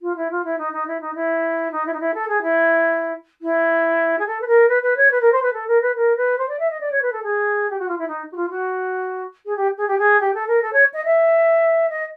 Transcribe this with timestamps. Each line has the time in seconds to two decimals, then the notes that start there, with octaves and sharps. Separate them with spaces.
0.02 F4
0.16 E4
0.31 F4
0.44 E4
0.58 D#4
0.73 D#4
0.87 E4
1.01 D#4
1.15 E4
1.72 D#4
1.86 E4
1.93 D#4
2.00 E4
2.14 A4
2.28 G#4
2.42 E4
3.42 E4
4.19 G#4
4.27 A4
4.41 B4
4.47 A#4
4.69 B4
4.83 B4
4.97 C#5
5.11 B4
5.21 A#4
5.32 C5
5.43 B4
5.53 A4
5.68 A#4
5.82 B4
5.96 A#4
6.17 B4
6.38 C5
6.49 D5
6.59 E5
6.70 D#5
6.81 D5
6.92 C#5
7.02 B4
7.12 A4
7.23 G#4
7.70 G4
7.79 F#4
7.88 F4
7.98 E4
8.08 D#4
8.32 F#4
8.36 F4
8.50 F#4
9.46 G#4
9.57 G4
9.78 G#4
9.88 G4
9.98 G#4
10.20 G4
10.34 A4
10.48 A#4
10.62 A4
10.73 C#5
10.94 D#5
11.05 E5
11.89 D#5